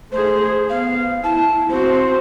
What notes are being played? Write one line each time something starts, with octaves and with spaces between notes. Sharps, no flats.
A3 G#4 C5
B3 F5
E4 A5
C4 F#4 C5